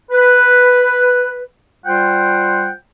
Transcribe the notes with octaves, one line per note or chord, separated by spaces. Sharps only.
B4
G3 F4 C5 F#5 G5